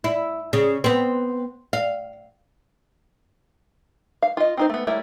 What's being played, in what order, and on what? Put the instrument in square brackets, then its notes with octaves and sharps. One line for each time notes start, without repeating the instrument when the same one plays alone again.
[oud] E4
C#3
B3 C4
F5
[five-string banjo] F5
F4 D#5
C4 D#4 C5
A3 B3
G3 A3 E4 A#4 C#5